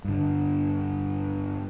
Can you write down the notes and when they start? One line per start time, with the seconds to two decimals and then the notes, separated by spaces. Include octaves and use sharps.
0.04 G2 D3